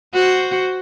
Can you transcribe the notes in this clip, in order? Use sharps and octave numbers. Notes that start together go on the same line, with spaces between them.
F#4 C5